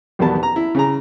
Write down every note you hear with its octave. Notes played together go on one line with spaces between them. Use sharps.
B1 E2 D#3 G3 B3 A5
A#5
E4
C#3 G#4 A#5